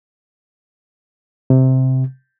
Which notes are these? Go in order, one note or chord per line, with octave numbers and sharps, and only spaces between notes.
C3